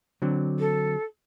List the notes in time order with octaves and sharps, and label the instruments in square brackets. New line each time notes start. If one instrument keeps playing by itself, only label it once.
[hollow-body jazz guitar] D3 F#3 C4
[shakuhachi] A4